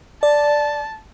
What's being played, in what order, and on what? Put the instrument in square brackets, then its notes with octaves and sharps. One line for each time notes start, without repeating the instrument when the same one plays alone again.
[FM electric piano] D5 [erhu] A5